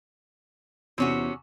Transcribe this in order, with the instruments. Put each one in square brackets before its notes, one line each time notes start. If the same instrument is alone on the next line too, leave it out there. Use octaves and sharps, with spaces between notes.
[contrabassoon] E2 [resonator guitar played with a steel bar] C3 C#4 F#4